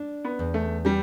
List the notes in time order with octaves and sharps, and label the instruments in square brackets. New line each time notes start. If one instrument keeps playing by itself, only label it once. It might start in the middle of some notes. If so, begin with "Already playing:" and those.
Already playing: [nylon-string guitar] D4
[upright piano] B3
[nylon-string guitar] E2
[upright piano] A3
[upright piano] G3 [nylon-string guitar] G4